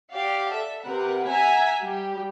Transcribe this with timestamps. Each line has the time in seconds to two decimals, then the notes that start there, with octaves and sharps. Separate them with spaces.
0.12 G4 D5 F5 F#5
0.53 A4 E5
0.81 C3 A#4 B4 F#5
1.27 E5 F#5 G#5 A#5 B6
1.82 G3 G4